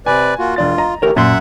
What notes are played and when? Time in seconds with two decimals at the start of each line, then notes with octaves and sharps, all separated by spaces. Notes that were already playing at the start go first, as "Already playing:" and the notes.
0.06 C3 B4 D5 G#5
0.39 A#3 F4 F#4
0.56 E1 D4 F4 A6
0.78 D#5 A#5
1.02 D3 E3 A3 G4 A#4 C#5
1.16 F#2 A#2 E5 F#5 C6